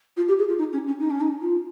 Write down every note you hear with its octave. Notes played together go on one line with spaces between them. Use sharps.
F4
G4
G#4
F4
D#4
C#4
C#4
D#4
C#4
D#4
F4